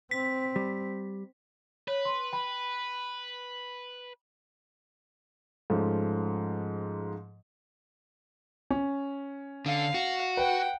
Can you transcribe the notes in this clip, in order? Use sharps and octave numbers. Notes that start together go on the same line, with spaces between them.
C4 B6
G3
B4 C#5
C6
G5 B5
G#2 F3 A3 C#4
C#4
D3 F5
F#4
B4 F#5 G5